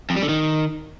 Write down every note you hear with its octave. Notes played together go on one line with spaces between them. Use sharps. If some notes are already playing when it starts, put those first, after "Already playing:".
F2
G3
D3
D#3